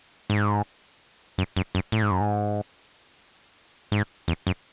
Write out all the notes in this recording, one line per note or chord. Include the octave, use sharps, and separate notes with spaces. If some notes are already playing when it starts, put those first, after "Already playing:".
G#2
F#2
F#2
F#2
A2
G#2
F#2
G#2
G#2
E2
F#2